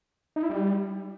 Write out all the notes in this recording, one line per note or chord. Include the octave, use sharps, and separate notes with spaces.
D#4
E4
G3